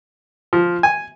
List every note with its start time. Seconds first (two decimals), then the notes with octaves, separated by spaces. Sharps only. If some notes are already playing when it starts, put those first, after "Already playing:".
0.53 F3
0.83 G#5